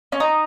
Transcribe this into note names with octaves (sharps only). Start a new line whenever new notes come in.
C#4
D#4